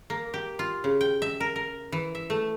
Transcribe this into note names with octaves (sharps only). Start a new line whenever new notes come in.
A#3
G4
F4
C#3
G5
E5
A#4
A#4
E3
E5
A3